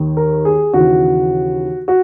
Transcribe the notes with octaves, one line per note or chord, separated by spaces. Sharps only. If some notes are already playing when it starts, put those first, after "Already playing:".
Already playing: D#2 D#3
A#4
G#4
D#2 C#3 E3 F#4
F#4